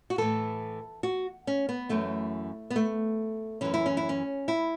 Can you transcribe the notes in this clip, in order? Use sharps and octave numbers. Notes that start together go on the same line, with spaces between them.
F#4
A2 E3 A4
F#4
C#4
B3
F#2 E3 A3
B3
A3
F#2 E3 C#4
E4
C#4
E4
C#4
E4